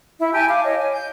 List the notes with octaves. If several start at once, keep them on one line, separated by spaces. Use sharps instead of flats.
E4 E5
G4 G#5 A5
F5 D6
C#5 D#5
G#5
G6